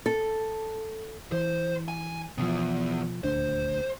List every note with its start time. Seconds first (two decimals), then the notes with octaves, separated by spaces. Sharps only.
0.06 A4
1.32 E3 C5
1.88 G#5
2.38 B2 E3 F3 B3
3.24 D#1 D2 D4 C5